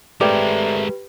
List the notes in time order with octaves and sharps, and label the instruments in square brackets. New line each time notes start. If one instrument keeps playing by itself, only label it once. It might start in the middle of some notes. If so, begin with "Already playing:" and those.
[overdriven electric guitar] G#3 A#4 [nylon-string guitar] A3 C4 [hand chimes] G4 B4 [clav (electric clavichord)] D5 G5